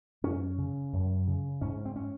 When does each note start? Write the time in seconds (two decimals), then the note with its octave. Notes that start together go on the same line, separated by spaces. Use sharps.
0.24 F#2 C#4
0.58 C#3
0.93 F#2
1.27 C#3
1.61 G#2 C#4
1.85 C4
1.96 C#4